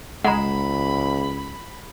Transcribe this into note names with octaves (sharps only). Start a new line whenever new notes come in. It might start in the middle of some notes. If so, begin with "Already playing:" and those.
C#2 G#3 F#5 A#5 B5